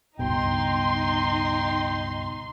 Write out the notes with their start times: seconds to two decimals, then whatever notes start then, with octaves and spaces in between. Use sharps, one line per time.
0.19 C#2 G2 B2 D#4 G5 C6